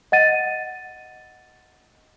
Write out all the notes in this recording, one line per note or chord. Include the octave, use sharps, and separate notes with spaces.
D#5 F#5 A6 D#7